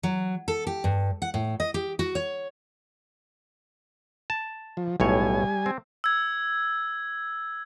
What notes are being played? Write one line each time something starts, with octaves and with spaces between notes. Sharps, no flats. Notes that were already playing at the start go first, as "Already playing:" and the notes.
F#3
A4
G4
G2
F#5
A2
D#5
G4
F#4
C#5
A5
F3
B1 A2 G3 C#5 G#5
C4
E6 G#6